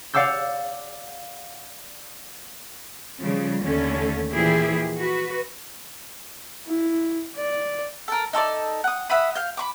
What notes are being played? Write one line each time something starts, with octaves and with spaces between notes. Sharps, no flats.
D5 F5 F#5 D6 E6 G6
C#3 F3 G3
D#2 D3 A3 C#4
A#2 E3 F3 E4 G4 G#4
F#4 B4
E4
D5
A4 A#4
D#4 A4 C#5 D5
F#5 D#6
E5 F#5 B5 D#6
F5 G6
B5 C#6 D6